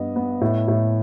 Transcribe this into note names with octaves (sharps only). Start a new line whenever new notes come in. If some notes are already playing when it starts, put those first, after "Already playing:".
Already playing: G2 B3 D#5
B3
A2
A2